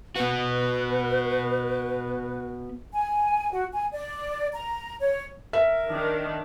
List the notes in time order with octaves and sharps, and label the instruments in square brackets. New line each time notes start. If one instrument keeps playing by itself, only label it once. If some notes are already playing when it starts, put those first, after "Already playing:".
[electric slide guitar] B3 F#4 [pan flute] B4
[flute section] G#5
F#4
G#5
D5
A#5
C#5
[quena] A#4 [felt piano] E5
[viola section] D#3 D4